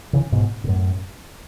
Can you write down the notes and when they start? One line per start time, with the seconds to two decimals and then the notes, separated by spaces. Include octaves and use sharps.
0.13 C#3 E3
0.32 G#2 B2
0.64 B2
0.67 F#2 A2